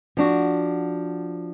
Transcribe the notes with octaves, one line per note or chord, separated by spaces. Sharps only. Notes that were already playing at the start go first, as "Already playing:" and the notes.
F3 D4 F#4